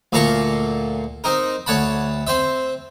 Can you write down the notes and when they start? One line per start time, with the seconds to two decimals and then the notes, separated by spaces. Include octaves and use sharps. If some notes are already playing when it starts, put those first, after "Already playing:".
0.12 D2 A#2 A4 F5 A#5 C#6
1.24 C4 D#4 A#4
1.66 D2 C#5 F#5 A5 B5
2.27 C4 C5 E5